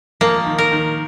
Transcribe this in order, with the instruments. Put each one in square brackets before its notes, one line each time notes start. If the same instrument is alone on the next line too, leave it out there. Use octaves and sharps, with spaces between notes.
[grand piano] F3 [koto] A#3
[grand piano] D#3
[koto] A#4
[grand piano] D#3